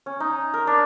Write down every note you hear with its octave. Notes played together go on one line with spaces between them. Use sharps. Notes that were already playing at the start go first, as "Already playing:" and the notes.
C#4
D#4
A#4
D4